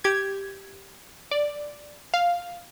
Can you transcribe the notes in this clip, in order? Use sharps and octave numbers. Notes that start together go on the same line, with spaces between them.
G4 G#6
D5
F5